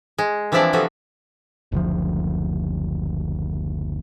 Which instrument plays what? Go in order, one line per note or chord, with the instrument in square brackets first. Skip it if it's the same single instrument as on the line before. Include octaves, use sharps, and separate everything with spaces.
[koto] G#3
E3 F3 C4 D4 E4 D5
C3 F3 B3 F#4 A4
[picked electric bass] F#1 D2 F3